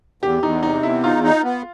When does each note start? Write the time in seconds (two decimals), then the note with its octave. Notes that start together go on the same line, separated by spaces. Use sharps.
0.23 E2 G4
0.43 E2 D#4
0.63 C3 D#4
0.83 E2 E4
1.03 D#4 F4
1.23 D#4
1.44 B3